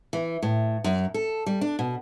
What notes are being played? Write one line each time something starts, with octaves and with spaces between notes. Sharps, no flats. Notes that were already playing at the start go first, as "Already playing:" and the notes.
E3
A2
F#2
A4
G3
D4
B2